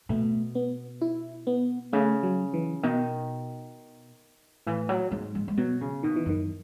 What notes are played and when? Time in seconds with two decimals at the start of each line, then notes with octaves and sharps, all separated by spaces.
0.09 B2 A3
0.55 B3
1.01 E4
1.47 B3
1.93 C#3 A3
2.23 F#3
2.54 E3
2.83 B2 D#3
4.67 A2 E3
4.89 F#3
5.11 G#2 G#3
5.35 G#3
5.48 G#3
5.57 B2 F#3
5.81 C#3
6.03 B2 D#3
6.16 E3
6.26 F#2 D#3